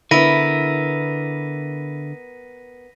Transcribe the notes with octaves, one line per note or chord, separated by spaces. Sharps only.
D3 B3 E4 A#4 A#6 B6 D#7